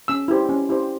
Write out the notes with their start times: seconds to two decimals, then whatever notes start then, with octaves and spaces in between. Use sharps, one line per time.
0.08 C#4 E6
0.28 E4 G4 C5
0.49 C#4
0.69 E4 G4 C5